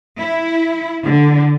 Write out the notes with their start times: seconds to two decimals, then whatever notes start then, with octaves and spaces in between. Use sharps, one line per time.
0.18 E4
1.04 D3